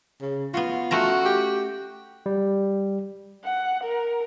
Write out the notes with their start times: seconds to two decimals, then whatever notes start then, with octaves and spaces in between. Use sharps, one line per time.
0.21 C#3
0.54 B3 F4 F#4
0.91 A3 C#4 F#4 A#5
1.25 G4
2.26 G3
3.44 F#5
3.84 A#4